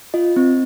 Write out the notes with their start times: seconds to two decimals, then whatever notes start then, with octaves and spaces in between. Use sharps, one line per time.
0.14 F4 D#5
0.36 C4